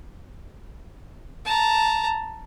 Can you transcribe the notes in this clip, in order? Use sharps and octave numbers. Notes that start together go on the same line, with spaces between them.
A5 A#5